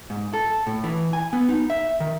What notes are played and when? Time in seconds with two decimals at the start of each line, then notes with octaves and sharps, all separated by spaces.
0.10 G#2
0.34 A4
0.67 A2
0.84 E3
1.13 G#5
1.33 B3
1.49 D#4
1.70 E5
2.00 D#3